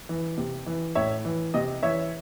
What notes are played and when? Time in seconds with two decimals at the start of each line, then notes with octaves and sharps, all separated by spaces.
0.09 E3
0.38 C3
0.66 E3
0.95 A2 C#5 E5
1.25 E3
1.54 C3 D#5
1.83 E3 C#5 E5